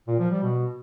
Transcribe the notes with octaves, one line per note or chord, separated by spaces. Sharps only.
A#2
F3
G3
B2